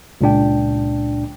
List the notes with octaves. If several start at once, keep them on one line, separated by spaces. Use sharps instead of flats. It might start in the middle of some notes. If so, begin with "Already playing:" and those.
C#2 A#2 D4 G5